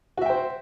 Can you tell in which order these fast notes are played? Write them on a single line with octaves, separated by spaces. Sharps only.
F#4 E5 G5 C5